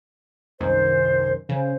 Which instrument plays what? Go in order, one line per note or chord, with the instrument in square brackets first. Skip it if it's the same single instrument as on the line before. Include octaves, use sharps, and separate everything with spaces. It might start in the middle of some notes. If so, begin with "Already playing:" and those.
[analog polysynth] C2 F#2 D#3 [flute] C5
[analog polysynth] C#3 [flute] C5